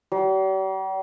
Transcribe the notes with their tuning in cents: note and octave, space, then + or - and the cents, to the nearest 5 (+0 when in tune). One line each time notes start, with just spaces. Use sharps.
G3 -45